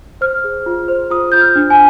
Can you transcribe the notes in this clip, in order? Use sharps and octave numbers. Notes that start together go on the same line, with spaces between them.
C5 F6
G#4
F4
C5
F4 D#6
F4 G6
F6
D4
G#5